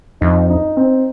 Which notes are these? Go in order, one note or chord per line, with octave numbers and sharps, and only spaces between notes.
F2 D#4
D#4
C4